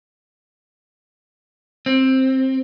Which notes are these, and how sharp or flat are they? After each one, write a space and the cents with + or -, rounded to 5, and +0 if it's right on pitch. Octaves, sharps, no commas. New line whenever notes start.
C4 +10